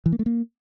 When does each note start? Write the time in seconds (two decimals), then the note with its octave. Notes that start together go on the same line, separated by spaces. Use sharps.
0.06 E3
0.12 A#3
0.19 A3
0.26 A#3